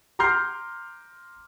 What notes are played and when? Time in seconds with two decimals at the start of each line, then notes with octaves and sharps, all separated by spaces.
0.19 A#5 C6 D6 F6 G6 C7